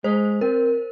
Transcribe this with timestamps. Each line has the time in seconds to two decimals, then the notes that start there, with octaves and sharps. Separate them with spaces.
0.04 G#3 C5
0.41 C4 A#4